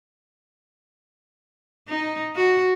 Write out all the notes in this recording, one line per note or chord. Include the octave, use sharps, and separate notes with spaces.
D#4
F#4